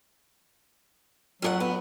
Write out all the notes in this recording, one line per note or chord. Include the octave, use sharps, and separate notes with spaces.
F2 F#3 G#4 F#5
B3